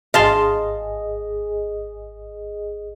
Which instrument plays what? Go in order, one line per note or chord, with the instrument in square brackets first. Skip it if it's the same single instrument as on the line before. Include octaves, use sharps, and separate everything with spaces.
[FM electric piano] G#1 G#4 D#5 [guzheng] F5 A5 C6